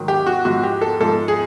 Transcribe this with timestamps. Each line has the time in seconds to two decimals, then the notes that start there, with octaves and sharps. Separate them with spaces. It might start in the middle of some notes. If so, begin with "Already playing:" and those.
Already playing: G#2 D#3 F#3
0.08 G4
0.26 F#4
0.45 G#2 F3 F#4
0.63 G4
0.81 A4
1.01 G#2 F3 A4
1.28 G#4